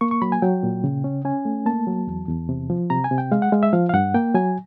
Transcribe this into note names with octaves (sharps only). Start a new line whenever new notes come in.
A#3 C#6
C#6
F#3 B5
G#5
F#3 G5
A#2
C#3
C#4
C#4 G#5
A3
A#3 A5
F#3
E2
E2
C3
F3
C3 A#5
G#5
C3
G5
G#3 F5
F#5
G#3 F5
E5
F3 F5
F5
G2 F#5
A#3 G5
F#3 G#5